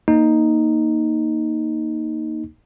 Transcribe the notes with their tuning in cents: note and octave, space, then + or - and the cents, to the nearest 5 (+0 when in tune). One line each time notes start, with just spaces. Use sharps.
A#3 +0 D#4 +0